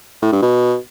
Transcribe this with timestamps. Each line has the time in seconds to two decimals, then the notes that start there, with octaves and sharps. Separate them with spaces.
0.22 A2
0.32 G2
0.42 B2